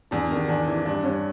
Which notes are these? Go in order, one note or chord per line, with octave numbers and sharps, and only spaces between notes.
E2 D4
D#3
E2 D4
E3
G2 D4
G2 C#4